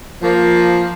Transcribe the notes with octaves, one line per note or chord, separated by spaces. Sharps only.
F3 A#3